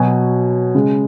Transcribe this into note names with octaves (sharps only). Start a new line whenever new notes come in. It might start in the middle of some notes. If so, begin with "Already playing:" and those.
Already playing: B2 F#3 G#5
C#3 G#3